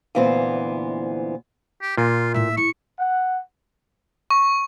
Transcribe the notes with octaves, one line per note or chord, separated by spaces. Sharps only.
D2 A#2 E3 B3 C4 C5
G4
A#2 F4
A2 A#3 E5
E4 C#6
F#5
C#6